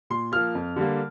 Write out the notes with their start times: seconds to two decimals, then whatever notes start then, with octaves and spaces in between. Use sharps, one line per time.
0.10 A#2 C6
0.32 F3 A#3 F6
0.55 F2
0.76 D3 G3 A#3